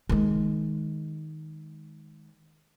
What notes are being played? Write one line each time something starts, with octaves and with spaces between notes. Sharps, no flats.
D#3 G#3